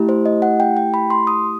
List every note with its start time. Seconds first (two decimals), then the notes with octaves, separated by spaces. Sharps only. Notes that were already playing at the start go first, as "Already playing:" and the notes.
Already playing: A3 E4 G4
0.09 C5
0.26 D#5
0.42 F#5
0.60 G5
0.77 G5
0.94 B5
1.10 C6
1.27 D#6